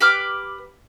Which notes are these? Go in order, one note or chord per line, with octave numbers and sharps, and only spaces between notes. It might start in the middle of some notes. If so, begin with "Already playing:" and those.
G4 B4 D6 F6